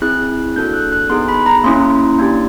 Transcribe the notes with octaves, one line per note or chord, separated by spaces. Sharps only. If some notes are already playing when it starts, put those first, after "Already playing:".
C4 E4 G#4 F#6
A#3 D4 F#4 A4 G6
F#6
F#6
B3 D#4 G#4 C6
B5
A#5
A#3 C#4 E4 C6
A#3 D4 G4